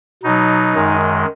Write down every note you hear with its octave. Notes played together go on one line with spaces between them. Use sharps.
B2 F#3 D#4
F#2 D#3 G#3